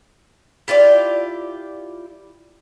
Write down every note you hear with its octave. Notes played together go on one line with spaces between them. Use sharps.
E4 F4 G4 D5